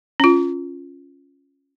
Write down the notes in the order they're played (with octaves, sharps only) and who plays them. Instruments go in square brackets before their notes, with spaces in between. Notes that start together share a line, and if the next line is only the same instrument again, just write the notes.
[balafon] C#4 F4